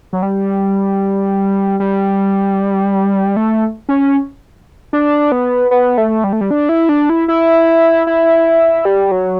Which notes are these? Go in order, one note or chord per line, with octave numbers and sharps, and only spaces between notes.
F#3
G3
G3
A3
C#4
D4
B3
B3
A3
G3
A3
G3
D4
E4
D4
E4
E4
E4
G3
F#3